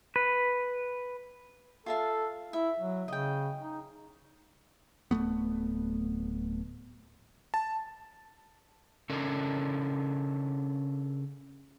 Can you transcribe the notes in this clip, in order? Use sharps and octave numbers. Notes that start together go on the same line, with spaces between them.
B4
F4 A4 E5 F5
E4 E5
F#3
C#3 D#5 G5
D#4
D1 F#2 A3 B3
A5
C#3 C#4 D4 A4 A#4